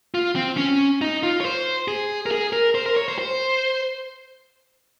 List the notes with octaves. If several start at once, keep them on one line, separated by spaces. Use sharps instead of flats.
F4
C4
C#4
D#4
F4
C#5
C5
G#4
A#4
G#4
A#4
C5
A#4
C#5
C5
C5